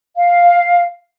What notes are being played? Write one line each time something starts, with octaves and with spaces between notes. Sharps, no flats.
F5